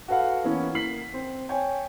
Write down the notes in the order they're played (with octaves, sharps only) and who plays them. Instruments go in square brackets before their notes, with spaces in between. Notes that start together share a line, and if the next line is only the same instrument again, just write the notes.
[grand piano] F#4 A4 B4 F5 F#5
E3 A#3 B3 C#4
A#3 B6 C7 F#7
C4
C#5 G5 G#5